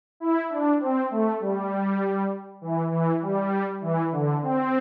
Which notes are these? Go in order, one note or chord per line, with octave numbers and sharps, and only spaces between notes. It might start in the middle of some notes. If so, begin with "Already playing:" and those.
E4
D4
C4
A3
G3
E3
E3
G3
E3
D3
C4